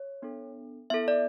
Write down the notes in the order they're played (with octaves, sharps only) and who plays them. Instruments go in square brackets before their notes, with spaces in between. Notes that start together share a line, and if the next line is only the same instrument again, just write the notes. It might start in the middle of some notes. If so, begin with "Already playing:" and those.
Already playing: [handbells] C#5
B3 D4 A4
B3 E4 A4 E5
D5